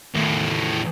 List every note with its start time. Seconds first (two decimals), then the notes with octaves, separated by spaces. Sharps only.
0.15 E2 A2 D#3 A3